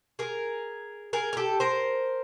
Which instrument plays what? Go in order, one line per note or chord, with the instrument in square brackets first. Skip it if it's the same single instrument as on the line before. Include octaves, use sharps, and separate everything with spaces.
[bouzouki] G#4 A#4
G#4 A#4
A#4
G4 A4
A#4 C5